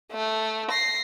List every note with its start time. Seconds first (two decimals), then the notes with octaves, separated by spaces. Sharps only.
0.12 A3
0.71 A#6 C7